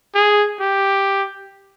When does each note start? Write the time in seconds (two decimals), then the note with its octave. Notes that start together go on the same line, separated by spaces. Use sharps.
0.15 G#4
0.61 G4